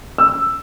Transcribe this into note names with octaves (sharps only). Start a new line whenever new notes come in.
E6